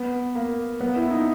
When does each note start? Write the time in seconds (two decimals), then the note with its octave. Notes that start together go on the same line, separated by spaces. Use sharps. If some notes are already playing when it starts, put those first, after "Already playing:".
Already playing: B3
0.35 A#3
0.81 B3
0.96 E4
1.11 D#4